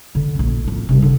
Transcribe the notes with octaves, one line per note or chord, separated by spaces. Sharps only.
D3
A#1 C#4
F2 A2
C3 G3
D3